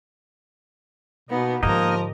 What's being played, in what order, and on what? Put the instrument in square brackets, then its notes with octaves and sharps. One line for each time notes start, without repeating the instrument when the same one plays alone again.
[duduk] B2 [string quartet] A#3 B3 D#4
[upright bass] G#2 D3 [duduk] F3 [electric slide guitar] A#3 D#4 [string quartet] G4 A#4 D#5